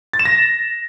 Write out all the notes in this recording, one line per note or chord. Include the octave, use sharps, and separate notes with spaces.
A6
E7
A#6